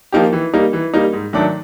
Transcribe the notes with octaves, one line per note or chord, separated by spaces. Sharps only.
F3 A#3 D#4 G4
E3
G3 A#3 D#4
E3
G3 A#3 D#4
G#2
D#3 F#3 A3 D4